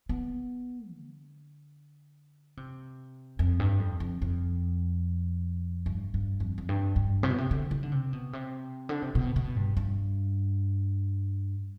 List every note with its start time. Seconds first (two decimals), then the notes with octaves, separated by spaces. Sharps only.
0.09 B3
0.92 D3
2.57 C3
3.39 F2
3.60 G2
3.80 F2
4.00 F2
4.22 F2
5.86 G2
6.14 G2
6.40 F2
6.58 F2
6.69 G2
6.96 G2
7.23 C3
7.30 B2
7.38 C3
7.51 D3
7.71 D#3
7.83 D3
7.92 C3
8.13 B2
8.33 C3
8.89 D3
9.02 C3
9.15 B2
9.36 B2
9.56 G2
9.77 G2